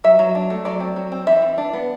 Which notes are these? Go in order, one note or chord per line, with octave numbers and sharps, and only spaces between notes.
F#3 E5
F#3
D4
A3
F#3 D5
C4
F#3
C4
E3 E5
E3
D4
B3